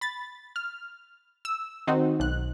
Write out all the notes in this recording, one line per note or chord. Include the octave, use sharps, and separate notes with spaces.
B5 A6
F6
E6
D#3 C4 D#4 F#4
B1 F#6